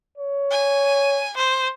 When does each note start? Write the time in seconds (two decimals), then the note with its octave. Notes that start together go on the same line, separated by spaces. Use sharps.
0.17 C#5
0.51 G#5
1.37 C5